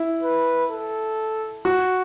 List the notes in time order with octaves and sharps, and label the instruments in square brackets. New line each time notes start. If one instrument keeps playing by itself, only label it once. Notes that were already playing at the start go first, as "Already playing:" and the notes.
Already playing: [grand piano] E4
[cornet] B4
A4
[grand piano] F#4